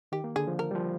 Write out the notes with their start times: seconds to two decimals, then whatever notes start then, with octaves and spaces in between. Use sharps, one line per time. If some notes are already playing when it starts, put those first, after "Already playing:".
0.12 D#3 G4
0.24 A#3
0.36 D3 G#4
0.48 F3
0.59 A#4
0.71 G3
0.75 F3